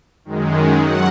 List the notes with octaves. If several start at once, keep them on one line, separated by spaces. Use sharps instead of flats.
F#2 D#3 G#3
F#2 D#3 F#3 F#5